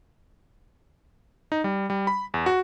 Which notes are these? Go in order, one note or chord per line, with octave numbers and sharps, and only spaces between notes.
D#4
G3
G3
B5
E2
F#4